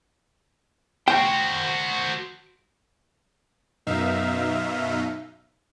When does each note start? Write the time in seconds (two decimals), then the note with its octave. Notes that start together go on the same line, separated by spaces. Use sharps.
1.08 F#4 C5 G5
3.87 F#2 B2 D#4 E5 F5